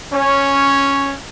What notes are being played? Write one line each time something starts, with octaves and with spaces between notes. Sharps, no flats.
C#4